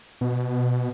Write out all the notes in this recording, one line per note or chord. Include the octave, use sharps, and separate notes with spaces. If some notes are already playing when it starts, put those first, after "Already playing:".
B2